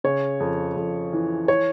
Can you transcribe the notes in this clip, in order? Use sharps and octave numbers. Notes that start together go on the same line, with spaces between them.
C#3 C#5
F2
F2
E3
C#5